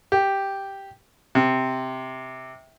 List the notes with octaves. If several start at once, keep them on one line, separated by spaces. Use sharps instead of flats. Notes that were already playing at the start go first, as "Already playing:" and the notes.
G4
C3